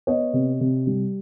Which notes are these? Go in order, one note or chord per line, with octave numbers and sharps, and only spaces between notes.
B3 C#5 D#5
C3
C3
G3